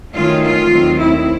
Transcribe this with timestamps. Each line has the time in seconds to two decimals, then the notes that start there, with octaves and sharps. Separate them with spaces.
0.12 F#2 D#3 F#3 A3 C#4 F4
0.41 F4
0.69 D#2 D#3 F#3 A3 C4
0.97 E4